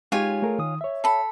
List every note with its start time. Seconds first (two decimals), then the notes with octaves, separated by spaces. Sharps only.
0.12 G#3 D#4 F4 G4 C#5 G#5
0.42 A3 G#4 A#4
0.59 D#3 D#6
0.81 C#5 E5
1.04 A4 B5